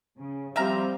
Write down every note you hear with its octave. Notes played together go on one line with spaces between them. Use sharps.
C#3
F3 G3 C4 E5 F5 A#5